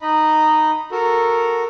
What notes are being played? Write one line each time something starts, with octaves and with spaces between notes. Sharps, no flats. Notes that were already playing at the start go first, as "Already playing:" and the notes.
D#4 D#5 B5
F#4 A4 A#4